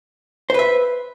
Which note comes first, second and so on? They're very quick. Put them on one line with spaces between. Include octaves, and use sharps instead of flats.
C5 B4 E5